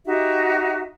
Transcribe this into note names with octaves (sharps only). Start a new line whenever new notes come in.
D#4 F#4 G4 E5